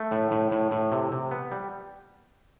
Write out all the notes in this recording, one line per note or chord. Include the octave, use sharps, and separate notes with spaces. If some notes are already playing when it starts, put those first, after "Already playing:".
Already playing: A3
A2
A2
A2
A2
C3
C3
B3
G3